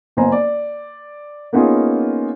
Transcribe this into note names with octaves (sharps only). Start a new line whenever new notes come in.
F#1 B3 C5 G#5 A#5
D5
A#3 B3 C#4 D#4 F4 G#4